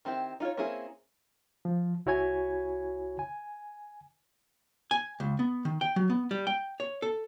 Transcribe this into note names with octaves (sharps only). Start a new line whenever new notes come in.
D#3 C4 E4 G4
D#4 F4 G#4 C#5
A#3 C4 C#4 E4 G#4
F3
C2 E4 F#4 C#5 G#5 G#6
G#5
G#5
C#2
B3
D#3
G5
F#3
B3
G3
G5
C#5
A4